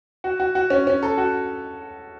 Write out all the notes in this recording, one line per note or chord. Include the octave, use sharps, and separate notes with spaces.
F#4
F#4
F#4
C#4
C#4
A4
F#4